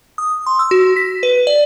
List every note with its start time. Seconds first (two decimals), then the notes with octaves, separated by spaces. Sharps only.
0.18 D#6
0.46 C6
0.59 E6
0.71 F#4
0.96 B6
1.23 B4
1.47 D5